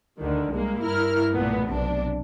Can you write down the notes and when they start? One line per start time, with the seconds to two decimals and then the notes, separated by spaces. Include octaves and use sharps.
0.19 D2 D3 D#3
0.52 C2 G#3 A#3
0.81 G2 E4 A#4 F6
1.32 B1 A#2 A3 B3
1.68 B1 C3 D4